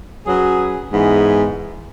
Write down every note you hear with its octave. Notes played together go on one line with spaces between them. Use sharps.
F#3 C#4 G#4 B4
G#2 E3 B3 G#4